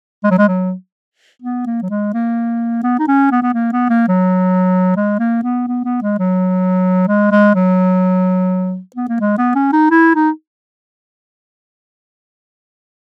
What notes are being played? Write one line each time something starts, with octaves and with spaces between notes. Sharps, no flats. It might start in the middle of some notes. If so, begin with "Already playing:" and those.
G#3
F#3
G#3
F#3
B3
A#3
F#3
G#3
A#3
B3
D#4
C#4
B3
B3
A#3
B3
A#3
F#3
G#3
A#3
B3
B3
B3
G#3
F#3
G#3
G#3
F#3
B3
A#3
G#3
B3
C#4
D#4
E4
D#4